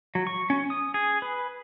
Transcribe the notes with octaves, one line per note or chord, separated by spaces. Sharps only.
F#3
C#6
C#4
D#6
G#4
B4